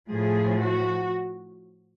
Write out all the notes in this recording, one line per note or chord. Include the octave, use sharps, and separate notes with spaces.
A2 F3 G#4
F#4